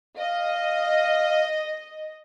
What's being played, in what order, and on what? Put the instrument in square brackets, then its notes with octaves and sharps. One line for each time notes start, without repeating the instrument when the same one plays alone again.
[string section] D#5 [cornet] F5